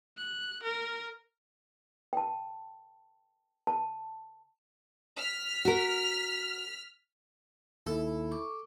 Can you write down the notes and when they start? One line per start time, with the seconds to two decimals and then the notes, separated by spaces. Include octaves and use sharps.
0.18 F#6
0.63 A#4
2.13 G5 A5
3.67 A5
5.18 F6 B6
5.65 F#4 A#4
7.87 D#2 E4 A4
8.31 C#6 D6